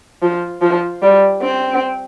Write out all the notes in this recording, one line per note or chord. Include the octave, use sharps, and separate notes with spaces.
F3
F3
G3
C4